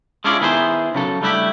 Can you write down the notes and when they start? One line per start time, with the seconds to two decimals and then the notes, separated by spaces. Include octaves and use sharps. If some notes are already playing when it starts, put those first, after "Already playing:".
0.24 G#3 C#4 D4 E4 F4 D5
0.41 D#3 B3 E4 G#4 A#4 C5
0.94 C#3 F#3 A4
1.22 G3 A3 D4 E4 F#4 G4